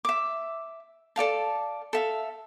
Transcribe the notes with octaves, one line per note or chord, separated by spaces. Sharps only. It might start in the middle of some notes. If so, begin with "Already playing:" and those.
E5 D6
A4 D5 F5 A5
A4 E5 F5